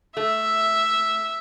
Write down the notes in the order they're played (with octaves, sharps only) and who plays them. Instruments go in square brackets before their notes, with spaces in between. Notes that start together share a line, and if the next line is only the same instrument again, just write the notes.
[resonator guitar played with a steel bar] A3 [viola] E5